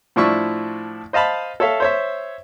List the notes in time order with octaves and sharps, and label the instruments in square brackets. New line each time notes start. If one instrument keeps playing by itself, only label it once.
[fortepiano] A2 F3 D4 E4 C#6 E6
C5 D#5 F5 A5 B5
A4 C#5 E5 F5
C5 C#5 E5